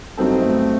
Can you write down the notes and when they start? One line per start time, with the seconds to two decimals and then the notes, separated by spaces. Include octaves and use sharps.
0.17 G2 F#3 B3 C4 D#4 A4
0.42 A3